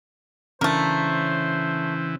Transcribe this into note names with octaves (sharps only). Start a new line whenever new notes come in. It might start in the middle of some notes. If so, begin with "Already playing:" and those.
C#3 E3 A3 C#4 D4 A#4 C5